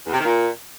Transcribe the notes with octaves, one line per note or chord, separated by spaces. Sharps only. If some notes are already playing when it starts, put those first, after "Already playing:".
E2
C3
D#3
A#2